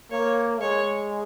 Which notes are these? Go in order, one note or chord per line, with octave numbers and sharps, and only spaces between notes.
A#3 C#5
G#3 C#5